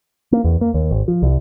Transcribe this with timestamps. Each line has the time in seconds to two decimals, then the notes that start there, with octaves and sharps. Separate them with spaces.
0.32 A#3
0.44 E2
0.61 A#3
0.74 D#2
0.91 G#1
1.08 F3
1.23 C2